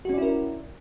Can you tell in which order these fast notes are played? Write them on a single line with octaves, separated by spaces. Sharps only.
F#4 C#4 D5 E4 A#4